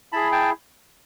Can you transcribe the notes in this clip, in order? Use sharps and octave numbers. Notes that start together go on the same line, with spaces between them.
E4 G#4 A5 B5
G5 A5